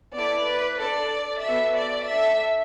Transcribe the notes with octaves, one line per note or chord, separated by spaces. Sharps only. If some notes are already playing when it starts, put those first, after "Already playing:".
B3 E4 A4 D5
B4
D4 A4 D5
B3 F#4 A4 E5
D5
A3 D4 A4 E5